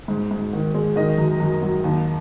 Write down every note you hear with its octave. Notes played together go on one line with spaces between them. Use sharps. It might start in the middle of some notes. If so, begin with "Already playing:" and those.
G#2
G#2
D#3
G#3
D#3 D#5
F#2
F#2
F#3
D#2